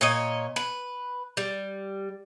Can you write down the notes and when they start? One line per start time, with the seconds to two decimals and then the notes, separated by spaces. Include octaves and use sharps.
0.01 A#2 C#5 D#5
0.56 B4
1.37 G3